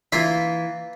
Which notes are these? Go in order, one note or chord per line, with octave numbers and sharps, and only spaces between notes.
E3 A#3 F4 E5